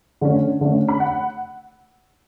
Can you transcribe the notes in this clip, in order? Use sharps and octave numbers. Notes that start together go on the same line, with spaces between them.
D3 A3 C#4
D3 A3 C#4
B5
F#5